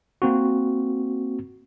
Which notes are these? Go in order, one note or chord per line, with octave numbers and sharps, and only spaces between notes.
A#3 C4 F#4